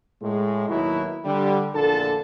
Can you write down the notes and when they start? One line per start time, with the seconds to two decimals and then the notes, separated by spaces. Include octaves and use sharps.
0.22 A2 G#3
0.69 D#2 B2 F#3 E4
1.25 D3 G3
1.74 A#1 E2 A#2 D3 A4 A5